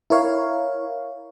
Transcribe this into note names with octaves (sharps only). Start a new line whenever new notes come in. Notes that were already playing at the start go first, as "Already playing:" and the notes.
E4 A#4 C#5 F5